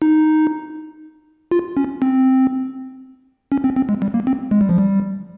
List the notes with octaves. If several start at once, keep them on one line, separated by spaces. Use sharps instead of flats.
D#4
F4
C#4
C4
C#4
C4
C4
G#3
G3
A#3
C4
G#3
G3
F3
G3